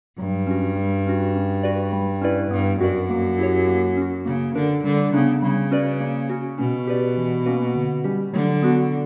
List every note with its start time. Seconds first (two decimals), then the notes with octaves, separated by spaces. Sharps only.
0.18 G2 F#3
0.47 C#4 F#4
0.76 G3
1.06 C#4 F#4
1.35 C#4
1.63 F#4 B4 D5
1.93 G3
2.21 C#4 E4 B4 D5
2.51 G2 B3
2.80 F#2 F#4 A#4 D5
3.10 A#3
3.39 E4 G4 C#5
3.67 A#3
3.97 C#4 F#4
4.25 C#3 A#3
4.55 D3 D4 A#4
4.84 D3 G3
5.13 C#3 B3 D4
5.42 C#3 G3
5.71 C#4 F#4 B4 D5
6.01 A#3
6.30 C#4 F#4
6.58 B2 C#4
6.87 G4 B4 D5
7.17 E3
7.46 A#3 C#4 F#4 B4
7.75 D3
8.04 G3 C#4 G4
8.33 D3 F#3
8.62 B3 D4 F#4